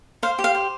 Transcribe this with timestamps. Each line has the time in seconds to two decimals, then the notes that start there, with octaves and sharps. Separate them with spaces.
0.23 C5 F5
0.39 G4
0.44 F5
0.55 C5